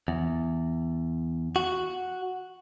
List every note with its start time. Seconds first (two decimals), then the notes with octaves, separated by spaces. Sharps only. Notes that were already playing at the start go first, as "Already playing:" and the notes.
0.08 E2
1.56 F#4